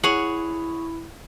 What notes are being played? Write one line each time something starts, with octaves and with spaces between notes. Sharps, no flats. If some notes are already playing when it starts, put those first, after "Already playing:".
E4 G#4 C#5 F#5